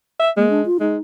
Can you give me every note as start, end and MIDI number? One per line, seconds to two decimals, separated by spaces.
0.20 0.30 76
0.37 0.64 56
0.37 0.48 58
0.50 0.62 62
0.65 0.78 65
0.80 0.97 56
0.80 1.02 63